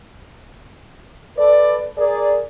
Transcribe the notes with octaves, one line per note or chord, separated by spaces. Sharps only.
A4 B4 D5
G#4 A#4 D5